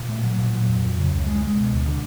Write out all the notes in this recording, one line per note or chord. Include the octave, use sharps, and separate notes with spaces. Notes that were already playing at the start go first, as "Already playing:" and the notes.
Already playing: A#2
A3
F#3
A#2
F#3
F2
F2
C#3
C#2
G#3
G#3
B2
D2
D3